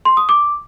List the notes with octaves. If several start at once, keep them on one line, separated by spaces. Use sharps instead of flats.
C6
D#6
D6